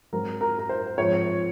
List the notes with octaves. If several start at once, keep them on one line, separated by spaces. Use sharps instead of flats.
G#2 F#3 C4 A#4
A#4
A#4
C5
G#2 F3 C4 C#5